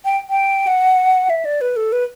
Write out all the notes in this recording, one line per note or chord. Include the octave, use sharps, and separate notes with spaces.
G5
G5
F#5
E5
D5
B4
A4
B4